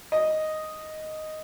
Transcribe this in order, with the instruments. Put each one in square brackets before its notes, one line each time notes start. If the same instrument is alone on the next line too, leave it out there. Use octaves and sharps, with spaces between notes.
[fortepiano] D#5